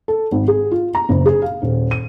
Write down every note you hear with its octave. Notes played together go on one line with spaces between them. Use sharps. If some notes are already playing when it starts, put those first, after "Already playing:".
A4
G#1
G#4
F4
A#5
F#1
G#4
F5
D#1
D#7